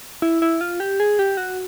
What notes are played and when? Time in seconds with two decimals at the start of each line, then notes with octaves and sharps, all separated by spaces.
0.22 E4
0.42 E4
0.61 F4
0.80 G4
1.00 G#4
1.19 G4
1.37 F#4